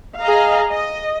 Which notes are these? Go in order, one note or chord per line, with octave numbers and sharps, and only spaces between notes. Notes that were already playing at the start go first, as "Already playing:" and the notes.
G#4 D#5 F5 A#5
D#5